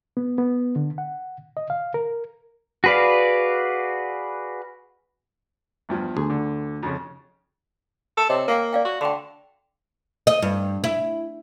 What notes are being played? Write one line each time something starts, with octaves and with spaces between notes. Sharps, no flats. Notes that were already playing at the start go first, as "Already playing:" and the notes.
B3
B3
D3
F#5
D#5
F5
A#4
F#4 G#4 B4 D5 F5
E2 G2 F3
D2 G#4
D3
F2 C#3
A4
C3 C#5 D#5 G5
A#3 A#4 F5 G5
D5 F5 G5
F#4
D3 G5 C6
D#5
G2
E4